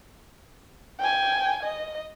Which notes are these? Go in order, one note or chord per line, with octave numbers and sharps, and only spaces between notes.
G5 G#5
D#5